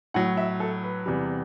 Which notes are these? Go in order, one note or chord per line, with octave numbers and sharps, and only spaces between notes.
A2 F#3 F#5
E5
A4
B4
E2 C3 G3